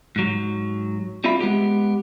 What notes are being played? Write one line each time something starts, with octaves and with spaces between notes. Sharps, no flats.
G#2 F#3
G3 C4 F4 G4 E5 B5
G#3 B3 G4